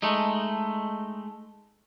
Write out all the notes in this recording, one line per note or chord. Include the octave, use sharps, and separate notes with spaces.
G#3 A3 D#4